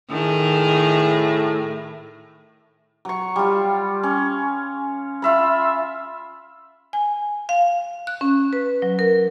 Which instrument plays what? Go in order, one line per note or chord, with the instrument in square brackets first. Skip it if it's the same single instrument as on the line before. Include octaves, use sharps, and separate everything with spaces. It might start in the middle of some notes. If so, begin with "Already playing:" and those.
[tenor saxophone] A2 [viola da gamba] D#3 G#4
[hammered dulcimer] F#3 C#6
G3 F4
C#4
F4 E5 B5
[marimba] G#5
F5
F#6
C#4
B4
F#3
A#4